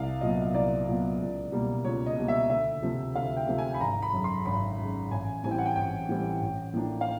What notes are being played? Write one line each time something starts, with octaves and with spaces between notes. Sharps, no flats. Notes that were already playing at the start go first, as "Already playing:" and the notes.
Already playing: C2 F5
A#2 F#3 B3 D#5
C2 D5
A#2 F#3 B3
C#2
B2 G3 A#3
C#2 C#5
D#5
B2 G3 A#3
E5
D2 E5
C3 F3 A3
D2 F5
G5
C3 F3 A3
G#5
B5
G#1 A#5
B5
F#2 C#3
C6
G#1 B5
F#2 C#3
A1 G#5
A2 E3 G3 C4 G#5
G5
F#5
G5
A1 G5
A2 E3 G3 C4
A1
A2 F3 A#3 D4
F5